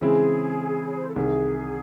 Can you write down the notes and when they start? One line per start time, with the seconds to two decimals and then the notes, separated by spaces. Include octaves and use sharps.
0.01 C#3 E3 G#3 C4 E4 G#4
0.87 C#5
0.97 C5
1.07 A4
1.16 C2 C3 D#3 G#4